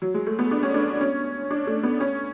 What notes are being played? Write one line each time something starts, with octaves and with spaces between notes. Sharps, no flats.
F#3
G#3
A3
B3
D4
C#4
D4
C#4
D4
A3
B3
C#4